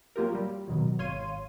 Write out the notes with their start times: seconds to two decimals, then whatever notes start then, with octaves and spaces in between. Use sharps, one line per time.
0.16 F#3 A#3 F4 G4 A#4
0.35 G3
0.68 B2 D#3 F#3
0.99 G#1 C#5 F5 C6 D#7